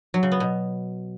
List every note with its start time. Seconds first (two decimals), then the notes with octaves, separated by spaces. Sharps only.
0.14 F#3
0.23 C#3
0.32 B3
0.40 B2